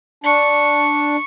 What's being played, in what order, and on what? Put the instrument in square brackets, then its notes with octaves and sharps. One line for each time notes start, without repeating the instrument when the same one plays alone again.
[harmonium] D4 [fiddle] C#6